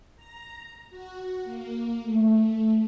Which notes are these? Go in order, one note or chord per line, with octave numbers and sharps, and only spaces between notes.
A#5
F#4
A#3
A3